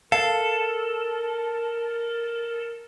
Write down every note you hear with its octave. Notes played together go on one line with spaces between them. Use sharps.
A4 A#4 F5